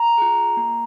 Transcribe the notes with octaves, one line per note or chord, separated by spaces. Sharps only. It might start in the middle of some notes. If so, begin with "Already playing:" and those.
Already playing: A#5
F4 G#4
A#3